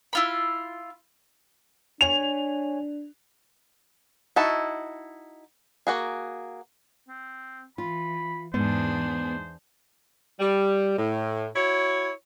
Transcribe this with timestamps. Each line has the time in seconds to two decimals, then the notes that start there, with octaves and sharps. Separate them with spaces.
0.13 E4 F4 B5
2.01 D4 C#5 G#5 F7
4.36 D#4 E4 F#4 A5
5.87 A#3 F#4 G#4
7.09 C4
7.78 E3 F4 B5
8.54 E2 G#2 B3 D4 G#4 C5
10.40 G3
10.98 A2
11.56 E4 F#4 C#5